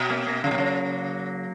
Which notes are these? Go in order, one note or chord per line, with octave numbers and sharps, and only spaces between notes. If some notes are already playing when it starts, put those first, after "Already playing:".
Already playing: B2
A#3 C#4
A#3 C#4
C#3 F#3 A#3
B2
C#3